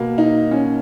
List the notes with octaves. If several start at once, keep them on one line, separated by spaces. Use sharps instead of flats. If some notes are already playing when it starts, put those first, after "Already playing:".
Already playing: B2 A#3
D#4
C#4